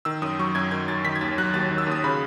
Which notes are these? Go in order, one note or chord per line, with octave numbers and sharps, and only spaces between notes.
D#3 E6
F#2 D#6
F#3 C#6
F#2 G#6
D#3 G#6
F#2 A6
D#3 B6
G#6
D#2 A6
F#3 F#6
D#2 A6
D#3
E6
D#2 D#6
C#3 B5